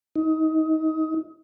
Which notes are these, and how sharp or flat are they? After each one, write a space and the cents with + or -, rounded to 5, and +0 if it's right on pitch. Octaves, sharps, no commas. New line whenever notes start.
D#4 +25